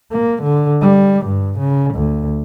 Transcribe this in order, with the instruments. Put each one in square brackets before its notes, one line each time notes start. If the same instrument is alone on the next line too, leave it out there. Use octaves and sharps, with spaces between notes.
[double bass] A#3
D3
G3
G2
C#3
D2